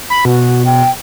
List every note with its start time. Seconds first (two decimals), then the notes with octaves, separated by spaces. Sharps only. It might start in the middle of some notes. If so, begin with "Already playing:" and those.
0.10 B5
0.25 B2 F#4
0.66 G5